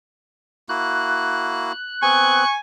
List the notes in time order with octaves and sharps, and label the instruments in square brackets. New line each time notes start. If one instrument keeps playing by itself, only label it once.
[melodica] A#3 E4 F#4 [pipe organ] F#6
[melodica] B3 C4 [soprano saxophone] G#5 [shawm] C#6